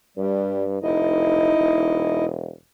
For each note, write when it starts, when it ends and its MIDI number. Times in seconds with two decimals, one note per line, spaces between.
0.17 0.79 43
0.17 0.64 55
0.83 1.51 29
0.83 2.25 63
0.83 2.25 64
0.83 2.25 75
1.59 2.50 28